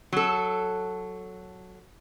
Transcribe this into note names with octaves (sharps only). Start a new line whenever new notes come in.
F#3 A4